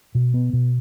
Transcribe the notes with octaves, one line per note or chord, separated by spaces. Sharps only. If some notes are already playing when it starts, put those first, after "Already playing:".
B2
B3
B2